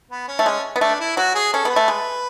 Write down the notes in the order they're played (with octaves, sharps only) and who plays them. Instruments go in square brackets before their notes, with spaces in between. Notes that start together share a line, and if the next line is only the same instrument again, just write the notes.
[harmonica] B3
C#4
[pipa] A3
[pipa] G#3 [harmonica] C#4
[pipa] B3
[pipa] A3 [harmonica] D4
[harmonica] E4
[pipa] F#3 [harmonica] F#4
[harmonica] G#4
[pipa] C#4 [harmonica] A4
[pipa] B3 [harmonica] B4
[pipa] A3
G#3